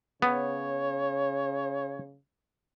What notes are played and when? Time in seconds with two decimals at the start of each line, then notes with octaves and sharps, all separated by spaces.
0.22 C#3 B3 C#5